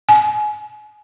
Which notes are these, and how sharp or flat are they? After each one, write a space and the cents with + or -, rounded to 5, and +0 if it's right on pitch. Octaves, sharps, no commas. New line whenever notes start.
G#5 +30